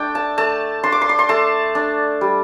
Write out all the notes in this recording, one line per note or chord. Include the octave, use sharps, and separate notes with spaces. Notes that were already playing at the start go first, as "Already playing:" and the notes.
Already playing: A3 D4 G5
A5
A3 A5
D4 C6
D6
C6
D6
C6
A3 A5
D4
G3